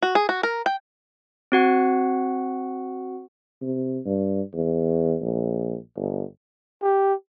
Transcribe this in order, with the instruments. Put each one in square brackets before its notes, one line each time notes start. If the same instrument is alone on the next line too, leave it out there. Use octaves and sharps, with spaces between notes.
[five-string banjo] F#4
G#4
F#4
A#4
G5
[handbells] C4 F#4 F#5
[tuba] C3
G2
E2
A#1
G1
[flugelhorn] G4